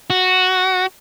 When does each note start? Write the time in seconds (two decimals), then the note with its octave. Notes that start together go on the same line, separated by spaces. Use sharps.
0.10 F#4